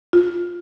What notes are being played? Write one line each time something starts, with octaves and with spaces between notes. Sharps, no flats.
F4